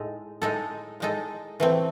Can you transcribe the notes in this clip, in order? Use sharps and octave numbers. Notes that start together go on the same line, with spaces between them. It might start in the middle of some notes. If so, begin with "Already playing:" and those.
Already playing: A2 G#3 D#4 A4
A2 G#3 D#4 A4
A2 G#3 D#4 A4
E3 A3 C4